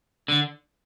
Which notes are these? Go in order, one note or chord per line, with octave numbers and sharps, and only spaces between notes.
D3